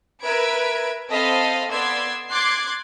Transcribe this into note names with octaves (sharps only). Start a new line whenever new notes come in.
A#4 B4 E5 B5 G#6 D7
C4 A4 C5 D#5 F5 B5
B3 D5 C6 E6 G#6
C6 D6 F#6 G#6 A6 C7